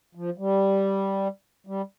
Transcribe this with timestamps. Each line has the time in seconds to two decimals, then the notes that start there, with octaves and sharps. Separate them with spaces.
0.15 F3
0.38 G3
1.67 G3